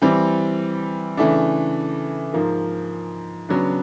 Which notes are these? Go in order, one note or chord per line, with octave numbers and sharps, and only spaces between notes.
E3 G3 C4
C#3 E3 A3 D4
G#2 F3 A#3
C#3 F#3 B3 D4